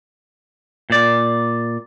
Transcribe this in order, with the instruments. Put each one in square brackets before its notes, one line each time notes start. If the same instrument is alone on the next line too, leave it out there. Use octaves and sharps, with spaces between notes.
[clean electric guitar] A#2 D5